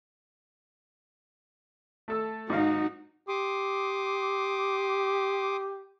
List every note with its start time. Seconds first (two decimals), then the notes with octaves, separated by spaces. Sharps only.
2.08 A3 A4 E6
2.50 G#2 D#4 F#4 F5
3.28 G4 C6 D6 D#6